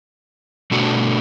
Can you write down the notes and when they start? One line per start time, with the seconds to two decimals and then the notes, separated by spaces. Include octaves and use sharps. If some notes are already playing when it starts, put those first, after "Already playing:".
0.71 B2 A3 D4 F#4